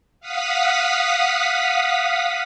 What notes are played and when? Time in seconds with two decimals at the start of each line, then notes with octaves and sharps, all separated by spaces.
0.20 F5 F#5 D#6 B6